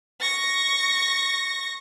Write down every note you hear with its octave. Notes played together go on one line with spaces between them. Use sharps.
C#6 A#6